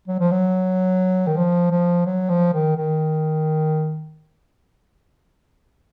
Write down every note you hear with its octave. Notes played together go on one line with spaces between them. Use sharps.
F#3
F3
F#3
D#3
F3
F3
F#3
F3
D#3
D#3